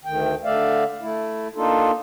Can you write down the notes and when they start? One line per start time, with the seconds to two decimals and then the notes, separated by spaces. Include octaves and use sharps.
0.05 D2 D#3 G5
0.44 D3 A3 D5 E5 F5
1.01 A3 E4
1.56 A#3 D4 D#4 F4 A4